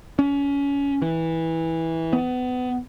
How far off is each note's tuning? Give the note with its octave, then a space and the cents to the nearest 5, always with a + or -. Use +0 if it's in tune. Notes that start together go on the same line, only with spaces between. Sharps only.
C#4 +25
E3 -15
B3 +25